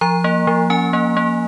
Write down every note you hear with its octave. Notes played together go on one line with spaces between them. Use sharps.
F3 A#5
A#3
F3
C#4 G#5
A#3
A#3